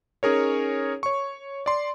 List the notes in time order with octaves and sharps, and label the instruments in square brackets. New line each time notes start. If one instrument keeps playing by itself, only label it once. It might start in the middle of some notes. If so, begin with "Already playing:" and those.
[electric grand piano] C#4 D#4 G#4 A#4 C#5
C#5 C#6
D5 C6